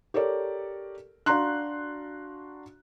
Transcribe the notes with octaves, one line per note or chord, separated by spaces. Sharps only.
G4 A4 A#4 C#5 D5
D4 F#4 F5 A#5 C6 F#6